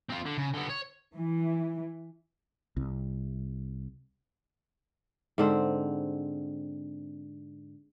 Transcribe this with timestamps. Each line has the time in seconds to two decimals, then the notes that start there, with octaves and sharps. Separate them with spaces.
0.10 C4 F4
0.26 D3
0.38 C#3
0.54 D3 B3
0.69 C#5
1.16 E3
2.77 C2
5.38 G#2 D3 C4